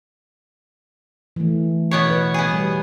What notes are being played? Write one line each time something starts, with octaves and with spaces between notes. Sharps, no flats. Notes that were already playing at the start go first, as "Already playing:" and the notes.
E3 A3
B2 B3 C#5
B4
B3 G#4
G3